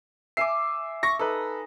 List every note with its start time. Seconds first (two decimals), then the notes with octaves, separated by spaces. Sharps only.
0.37 E5 G#5 D6 C7
1.03 C#6 A#6
1.19 D#4 A4 B4